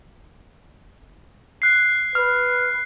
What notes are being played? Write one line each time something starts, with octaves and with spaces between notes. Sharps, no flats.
F#6 C7
B4 F6